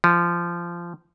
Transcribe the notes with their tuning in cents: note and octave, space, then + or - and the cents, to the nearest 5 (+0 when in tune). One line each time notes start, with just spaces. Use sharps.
F3 -20